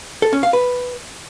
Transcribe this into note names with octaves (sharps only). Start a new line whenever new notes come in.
A4
C#4
F5
B4